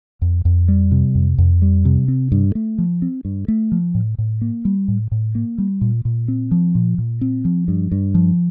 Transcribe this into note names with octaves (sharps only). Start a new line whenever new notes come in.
F2
F2
G3
C3
F2
F2
G3
C3
C4
G2
A3
F3
C4
G2
A3
F3
A2
A2
A#3
G3
A2
A2
A#3
G3
A#2
A#2
C4
F3
A#2
A#2
C4
F3
G2
G2
F3